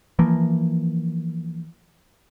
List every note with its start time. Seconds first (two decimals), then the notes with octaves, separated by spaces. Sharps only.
0.19 E3 F3 A#3